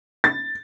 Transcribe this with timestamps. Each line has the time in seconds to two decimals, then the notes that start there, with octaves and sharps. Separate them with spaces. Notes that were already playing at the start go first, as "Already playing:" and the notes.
0.24 A6